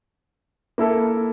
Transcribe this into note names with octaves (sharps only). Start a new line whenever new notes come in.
A#3 E4 A4